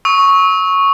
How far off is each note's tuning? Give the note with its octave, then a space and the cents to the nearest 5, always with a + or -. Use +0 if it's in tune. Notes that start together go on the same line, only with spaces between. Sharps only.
C#6 -5 E6 -40